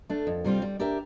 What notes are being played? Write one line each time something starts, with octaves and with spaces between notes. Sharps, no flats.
A3 D4
F2
C3 G3 C4 F4
G3
D4 G4 A#4 E5